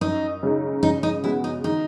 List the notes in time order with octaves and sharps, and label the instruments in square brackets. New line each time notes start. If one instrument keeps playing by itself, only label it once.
[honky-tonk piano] F#2 [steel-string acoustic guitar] D#4
[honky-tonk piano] C#3 G#3 D#4
[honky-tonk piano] C#3 [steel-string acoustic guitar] D#4
[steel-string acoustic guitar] D#4
[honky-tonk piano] G#3 B3 F#4 [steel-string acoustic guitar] E4
[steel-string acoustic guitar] D#4
[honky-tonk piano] D#3 [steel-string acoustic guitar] D#4